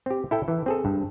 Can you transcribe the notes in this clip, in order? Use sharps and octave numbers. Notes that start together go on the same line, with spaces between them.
C4 G4
E4 A4 G5
E3
C4 G#4 A4
G2